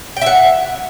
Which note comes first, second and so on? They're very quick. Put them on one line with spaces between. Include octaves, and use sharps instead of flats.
G5 E5 F#5